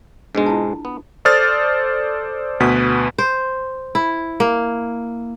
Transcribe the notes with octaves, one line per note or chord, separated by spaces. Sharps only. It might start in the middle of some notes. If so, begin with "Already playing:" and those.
G#2 B2 G#3 D4 G#4
E4 F4 A5
B3
A4 C5 D5 D#6 F6 A6
D2 B2 B4 B6
C5
E4
A#3